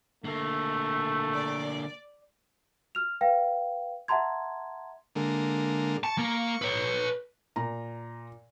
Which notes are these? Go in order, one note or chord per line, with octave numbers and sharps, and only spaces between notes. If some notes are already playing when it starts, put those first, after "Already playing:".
D3 A3 A#3
D5
F6 F7
B4 F5 G5
E5 F#5 A5 A#5 C6 G#6
D3 G#3 A#3
A5 C#6
A#3
B4 C#5
A#2 A#5